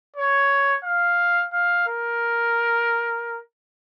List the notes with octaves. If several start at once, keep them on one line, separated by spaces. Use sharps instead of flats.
C#5
F5
F5
A#4